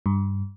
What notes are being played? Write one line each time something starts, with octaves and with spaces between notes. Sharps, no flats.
G2